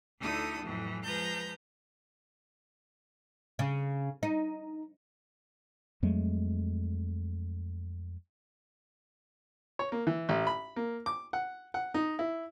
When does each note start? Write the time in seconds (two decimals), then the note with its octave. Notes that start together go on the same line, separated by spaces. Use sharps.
0.19 D2 D3 D#4 E4 A4 D#6
0.61 F2 A2 E3 F#3
1.03 F3 G#3 B4 A#5 G6
3.59 C#3
4.23 D#4
6.03 F2 F#3 G#3 A3
9.79 C#5
9.92 A#3
10.07 E3
10.29 A1
10.47 B5
10.76 A#3
11.06 D6
11.33 F#5
11.74 F#5
11.94 D#4
12.19 E4